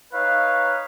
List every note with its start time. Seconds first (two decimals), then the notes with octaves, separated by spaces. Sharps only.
0.14 D#4 B4 C#5 F5